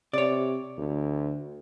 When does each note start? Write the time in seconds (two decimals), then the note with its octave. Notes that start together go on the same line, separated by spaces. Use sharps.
0.13 C3 C#5 D5
0.77 D2